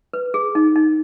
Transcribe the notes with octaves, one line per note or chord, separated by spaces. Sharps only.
B4
G#4
D#4
D#4